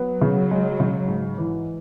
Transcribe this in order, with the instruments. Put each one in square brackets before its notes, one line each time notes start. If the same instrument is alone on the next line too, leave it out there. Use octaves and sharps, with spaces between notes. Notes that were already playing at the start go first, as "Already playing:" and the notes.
Already playing: [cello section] F#3 [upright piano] B3
[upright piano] C#3
G#3
C#3
G#2
E3